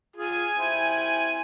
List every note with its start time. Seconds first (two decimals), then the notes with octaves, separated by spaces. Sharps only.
0.16 F4 G#4 G#5
0.57 C4 E4